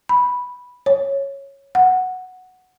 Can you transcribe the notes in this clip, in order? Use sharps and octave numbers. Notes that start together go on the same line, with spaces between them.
B5
C#5
F#5